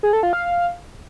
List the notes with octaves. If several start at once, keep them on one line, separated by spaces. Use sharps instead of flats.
G#4
A4
F4
F5